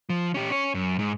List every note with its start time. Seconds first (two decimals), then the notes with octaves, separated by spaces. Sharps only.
0.09 F3
0.34 C#4 G4
0.50 C#4 C#5
0.74 F#2
0.99 G#2